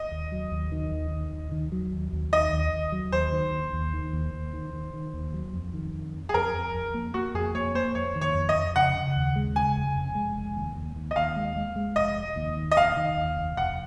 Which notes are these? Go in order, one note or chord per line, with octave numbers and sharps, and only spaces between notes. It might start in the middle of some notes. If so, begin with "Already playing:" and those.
Already playing: D#5
D#2
F#3
D#2
D#3
D#2
D#3
D#2
D#3
F#3
D#2
D#2
D#3 D#5
D#2
D#2
F#3
D#2 C5
D#3
D#2
D#2
D#3
D#2
D#2
D#3
D#3
D#3
D#2
F#3
F2
D#3
F2
F2
G#4
F2 A#4
F2
F2
A#3
A#3 F#4
F2 G#4
A#3 C#5
A#3 C5
F2 C#5
D#3
C#5
F2
D#5
F2
C#3 F#5
C#3
D#2
G#3
C#3 G#5
F1
F1
G#3
F1
D#2
D#2
D#2
D#5
D#2 F5
G#3
G#3
G#3
F1 D#5
F1
D#2
D#3
D#5
F1 F5
D#3
D#2
F1
F1 F#5